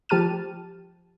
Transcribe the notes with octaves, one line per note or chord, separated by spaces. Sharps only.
F3 G4 A5 F6 D#7